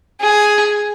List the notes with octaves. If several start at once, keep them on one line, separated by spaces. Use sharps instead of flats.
G#4